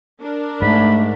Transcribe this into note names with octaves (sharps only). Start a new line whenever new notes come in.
D4 A#4
G#2 A3 B5